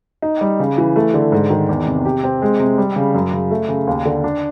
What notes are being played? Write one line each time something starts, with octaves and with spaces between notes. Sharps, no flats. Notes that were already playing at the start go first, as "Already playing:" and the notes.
D#4
G3
C#3
E3
A3
D3
G#2
D#3
E2
C3
G4
C4
G#3
C3
G3
C#3
F#2
C#3
A3
C#3
D#2
D3
D4